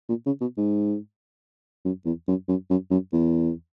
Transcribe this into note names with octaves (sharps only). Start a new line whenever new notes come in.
A#2
C#3
B2
G#2
F#2
E2
F#2
F#2
F#2
F#2
E2